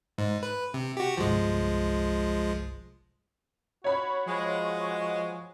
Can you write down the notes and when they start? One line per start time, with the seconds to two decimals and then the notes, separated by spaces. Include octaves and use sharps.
0.18 G#2
0.43 B4
0.74 C3
0.97 F#4 G4
1.17 G1 C2 F3 G#3
3.84 F#4 C#5 B5
4.26 F3 G#3